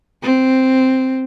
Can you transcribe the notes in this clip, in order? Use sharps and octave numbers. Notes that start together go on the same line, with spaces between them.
C4